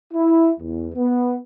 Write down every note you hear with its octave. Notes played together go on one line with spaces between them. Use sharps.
E4
E2
B3